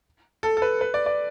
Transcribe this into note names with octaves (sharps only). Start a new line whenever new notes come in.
A4
A4
B4
B4
D5
D5